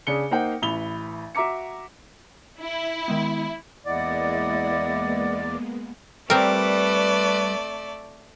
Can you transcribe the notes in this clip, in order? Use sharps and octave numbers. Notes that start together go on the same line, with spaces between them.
C#3 D4 G#4 C#7 G7
A#3 D#4 C5 F#5 G5
A1 E3 B5 F7 G7
F#4 E5 A#5 D6 C#7
E4
D#3 G#3 B3
E2 G#3 A#3 B3 E4 D5 D#5 F#5
G3 A3 C4 A#4 B4 D5